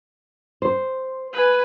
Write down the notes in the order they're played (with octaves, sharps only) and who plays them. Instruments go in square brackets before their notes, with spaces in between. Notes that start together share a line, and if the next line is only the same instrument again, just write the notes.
[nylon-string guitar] C5
[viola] B4 G#5